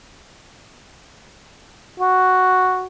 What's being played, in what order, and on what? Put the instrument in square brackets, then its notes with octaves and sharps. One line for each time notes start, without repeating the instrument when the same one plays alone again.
[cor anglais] F#4